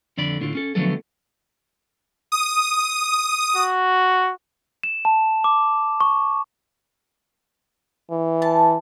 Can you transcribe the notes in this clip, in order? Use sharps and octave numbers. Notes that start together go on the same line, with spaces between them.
F2 D3 D5 B5
A2 D3 F4
C#4 A4
D3 F3 F#3 A3 B3 A4
D#6
F#4
E7
A5
D6
C#6
E3
A5